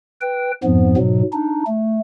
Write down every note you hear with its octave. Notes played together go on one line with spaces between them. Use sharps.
B4 G5
F2 G#2 F3 B3
G#2 B2 F#3
D4 D#4
A3